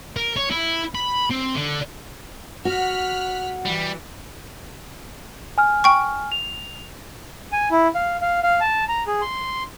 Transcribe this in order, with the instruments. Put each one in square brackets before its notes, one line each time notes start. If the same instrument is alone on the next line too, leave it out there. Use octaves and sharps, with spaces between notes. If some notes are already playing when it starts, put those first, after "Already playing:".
[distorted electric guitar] A#4
C#5
E4
B5
C4
D3
[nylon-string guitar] F#4 [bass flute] F#5 [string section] F6 F#6 B6
[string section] E3 [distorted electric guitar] G3
[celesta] G#5 F6
[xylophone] G5 C#6
[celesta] F7
[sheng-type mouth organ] G#5
E4
F5
F5
F5
A5
A#5
G#4
C6